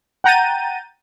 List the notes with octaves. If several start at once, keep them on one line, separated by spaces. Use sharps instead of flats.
F#5 G5 A#5 G6 A6 D#7